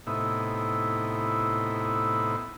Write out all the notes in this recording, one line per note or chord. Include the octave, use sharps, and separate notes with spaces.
A2 C3 B3 D#4 E4